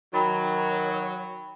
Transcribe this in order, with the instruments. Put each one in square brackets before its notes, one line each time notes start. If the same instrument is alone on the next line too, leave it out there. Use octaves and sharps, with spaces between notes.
[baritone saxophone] D#3 [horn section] F#3 [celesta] G5 B5 A6